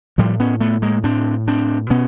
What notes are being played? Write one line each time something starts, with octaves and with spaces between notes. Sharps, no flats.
A2 F3 G3
B3 C#4
A3 B3
G#3 A#3
A2 C4 D4
C4 D4
B2 B3 C#4